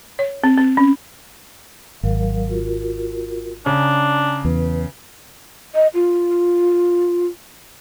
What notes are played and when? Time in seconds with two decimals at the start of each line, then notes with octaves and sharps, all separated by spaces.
0.19 C#5
0.44 C4
0.58 C4
0.77 C#4
2.03 G#1 F#3 A#4 F5
2.47 F4 F#4 A#4
3.66 C#3 D4 G#5 A#5
4.45 E2 B4
5.75 D#5
5.94 F4